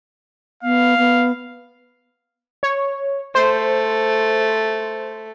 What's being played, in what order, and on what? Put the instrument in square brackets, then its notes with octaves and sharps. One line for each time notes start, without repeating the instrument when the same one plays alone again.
[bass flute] B3 [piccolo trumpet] F5
[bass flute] B3
[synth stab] C#5
[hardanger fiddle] A3 [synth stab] C5